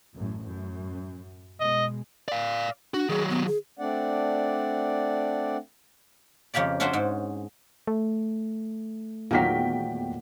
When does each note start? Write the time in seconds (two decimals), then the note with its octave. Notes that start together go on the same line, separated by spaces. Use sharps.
0.17 A1 F#2 A2
0.46 F#2
1.60 B2 G#3 D#5
2.28 D5 F5
2.94 D4 F#4
3.09 D#3 F#3 G#4
3.30 B3
3.47 G#4
3.79 A3 C4 D4 D5 F#5
6.54 F2 C#3 A#3 G4 D5
6.80 C#4 D4 F#4 C5 E5 G5
6.93 G#2
7.87 A3
9.31 E2 A#2 D#3 F#3 G5 B6